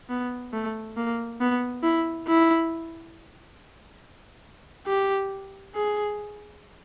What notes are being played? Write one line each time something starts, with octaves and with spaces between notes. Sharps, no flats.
B3
A3
A#3
B3
E4
E4
G4
G#4